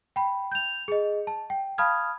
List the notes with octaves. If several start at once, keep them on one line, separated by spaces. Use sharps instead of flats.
G5 B5
G6 F7
G#4 D#5
A5
G5
F5 A5 B5 D#6 F6 G#6